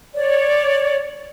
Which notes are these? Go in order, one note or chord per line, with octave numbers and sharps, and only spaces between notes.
C#5 D5